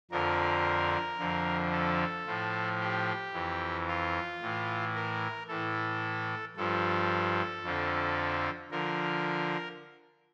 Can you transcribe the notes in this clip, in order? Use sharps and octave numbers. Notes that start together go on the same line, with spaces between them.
F2 D3 F3 A#4
F2 D3 F3
A4
A2 F3
G4
F2 E3
F4
A2 E3
A#4
A2 E3 A4
G2 F3 A4
F2 D3 F3
D3 F3 A#4